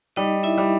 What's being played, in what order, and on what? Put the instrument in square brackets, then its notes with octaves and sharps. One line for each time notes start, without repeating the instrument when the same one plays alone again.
[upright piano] G3 [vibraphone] D#4 D#5
[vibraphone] E4 E5
[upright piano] G3